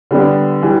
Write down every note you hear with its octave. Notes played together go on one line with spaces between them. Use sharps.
D3 G3 B3 D4
E3 G3